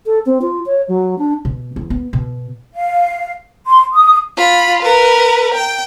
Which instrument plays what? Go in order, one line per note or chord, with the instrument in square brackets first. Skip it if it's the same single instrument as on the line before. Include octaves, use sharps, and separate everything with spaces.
[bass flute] A4
C4
F4
C#5
F#3
D4
[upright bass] B2
E2
B3
B2
[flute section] F5
C6
D#6
[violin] F4 B5
A#4 B4
G5